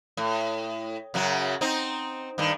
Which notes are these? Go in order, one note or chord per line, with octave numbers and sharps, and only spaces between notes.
A2
F#2 C#3 F#3
C4 D#4
G2 D#3